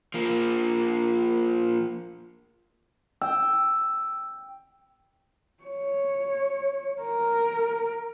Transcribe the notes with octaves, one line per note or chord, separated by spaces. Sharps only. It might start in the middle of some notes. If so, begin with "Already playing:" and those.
F3 A#3
G5 E6
C#5
A#4